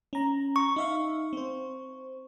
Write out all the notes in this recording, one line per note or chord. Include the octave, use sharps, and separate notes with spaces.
C#4 A#5
C#6
D#4 E5 F5
C4 C5